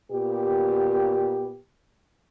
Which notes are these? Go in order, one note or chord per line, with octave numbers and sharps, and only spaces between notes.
A#2 B3 G4